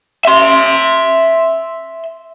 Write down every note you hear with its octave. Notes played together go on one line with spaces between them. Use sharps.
E5 C6